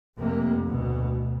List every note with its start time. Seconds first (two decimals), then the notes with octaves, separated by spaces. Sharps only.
0.17 F1 C3 A#3
0.66 D2 B2